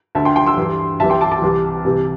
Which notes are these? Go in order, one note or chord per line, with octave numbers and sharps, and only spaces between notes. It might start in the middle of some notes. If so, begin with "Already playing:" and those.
D2 D3 E5 A5
G5 C6
G5 C6
C6 E6
G2 E3
C2 C3 E3 E5 A5
G5 C6
A5 D6
A5 D6
C2 C3 E3
C2 C3 E3